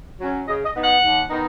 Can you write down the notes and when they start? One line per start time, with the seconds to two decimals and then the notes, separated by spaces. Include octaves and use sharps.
0.20 F#3 C#4
0.47 C#3 D#5
0.65 D#5
0.74 B3 D#4
0.84 F#5
1.02 D#2
1.30 D#3 B3 D#4